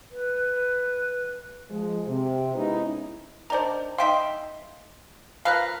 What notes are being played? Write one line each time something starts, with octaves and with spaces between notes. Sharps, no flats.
B4
F3 G#3
C3
G#3 B3 C#4 D#4 E4
D#3 D4 C5 D5 A#5
D#4 E5 F5 G5 C6 B6
F3 A#4 B4 F5 F6 F#6